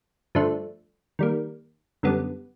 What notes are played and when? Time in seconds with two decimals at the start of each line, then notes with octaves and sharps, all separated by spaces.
0.35 G2 D3 F3 A3 D4
1.19 D#3 G3 A#3
2.03 F#2 D3 G3 B3